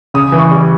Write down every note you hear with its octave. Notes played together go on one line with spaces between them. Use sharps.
C#3 D#6
E3
C#6
G3